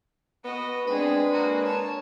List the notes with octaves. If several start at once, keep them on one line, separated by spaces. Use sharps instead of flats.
B3 F#4 D#5
G#3 C4 D4 G#4 B4
A#3 F#4
C#5 A5